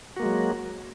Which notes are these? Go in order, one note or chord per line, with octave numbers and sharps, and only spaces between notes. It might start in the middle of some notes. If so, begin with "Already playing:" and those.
F#3 G#3 A#3 F#4